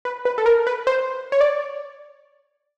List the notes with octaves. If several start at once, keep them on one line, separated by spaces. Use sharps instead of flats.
B4
B4
A4
A#4
B4
C5
C#5
D5